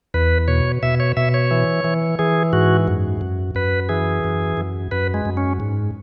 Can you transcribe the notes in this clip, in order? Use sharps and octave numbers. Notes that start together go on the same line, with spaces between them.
E2 B4
B2 C#5
B2 E5
C#5
B2 E5
C#5
E3
E3
E3 G#4
G#2 F#4
F#2
F#2
F#2 B4
E3 G#4
F#2
F#2
F#2 B4
G#3
F#2
C#4
G#2